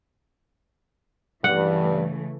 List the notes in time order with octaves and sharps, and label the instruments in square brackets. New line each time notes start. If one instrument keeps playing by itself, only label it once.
[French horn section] G2 [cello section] C#3 E3 A3 [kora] F#5